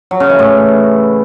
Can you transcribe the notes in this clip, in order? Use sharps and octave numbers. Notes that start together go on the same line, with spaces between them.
F#3
C#3
E3
A2